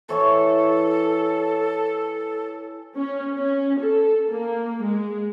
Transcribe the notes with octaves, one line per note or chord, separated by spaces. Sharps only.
E3 A4 C#5 C#6
C#4
C#4
A4
A#3
G#3